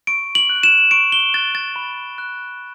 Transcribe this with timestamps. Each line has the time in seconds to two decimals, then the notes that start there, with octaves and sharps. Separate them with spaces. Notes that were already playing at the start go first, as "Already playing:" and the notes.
0.07 C#6 D7
0.35 F#7
0.49 F#6
0.63 E7
0.91 C#6 D7
1.12 G7
1.34 F#6 A6
1.55 A6
1.76 B5
2.18 F#6